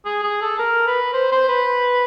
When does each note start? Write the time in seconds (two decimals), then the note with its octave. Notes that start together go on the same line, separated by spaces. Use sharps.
0.05 G#4
0.24 G#4
0.42 A4
0.59 A#4
0.87 B4
1.13 C5
1.32 C5
1.49 B4